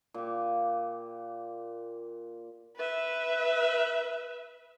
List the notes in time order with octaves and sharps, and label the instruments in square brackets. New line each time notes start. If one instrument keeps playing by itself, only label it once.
[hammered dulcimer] A#2 G4
[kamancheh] B4 E5